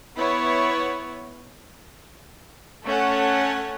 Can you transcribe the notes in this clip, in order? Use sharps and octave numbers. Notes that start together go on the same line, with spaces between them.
B3 E4 C#5
A3 C#4 A4 C#5 F#5